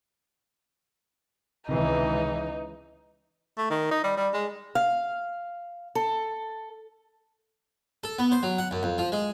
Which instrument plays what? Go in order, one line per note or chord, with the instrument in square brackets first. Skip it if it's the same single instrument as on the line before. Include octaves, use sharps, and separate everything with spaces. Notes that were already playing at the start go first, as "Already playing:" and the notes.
[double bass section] C#2 E3 [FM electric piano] C3 D#3 [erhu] D#4
[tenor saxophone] A3
D#3
D#4
G3
G3
G#3
[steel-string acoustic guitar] F5
A4
[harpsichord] A4
B3
C5
F#3
F#5
F#2
F2
F3
G#3